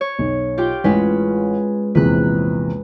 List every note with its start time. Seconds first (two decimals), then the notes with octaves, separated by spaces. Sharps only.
0.01 C#5
0.19 B1
0.58 F4 G4 G5
0.84 A1 G#3 C#4 B4
1.95 A#1 E2 C3 B4 F#6